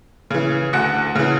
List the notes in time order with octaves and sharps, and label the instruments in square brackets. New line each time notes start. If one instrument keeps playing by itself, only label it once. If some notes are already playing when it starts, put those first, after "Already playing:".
[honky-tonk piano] C#3 E3
D2 F#5
C#3 E3